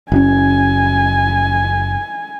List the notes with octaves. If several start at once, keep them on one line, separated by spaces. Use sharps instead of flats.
F#1 C#4 G#5